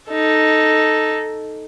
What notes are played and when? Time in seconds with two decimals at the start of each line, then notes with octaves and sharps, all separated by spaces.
0.10 D#4 A4